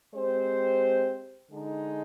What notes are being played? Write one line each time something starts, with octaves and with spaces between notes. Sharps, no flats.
G#3 C4 G4 C5
D3 G#3 D#4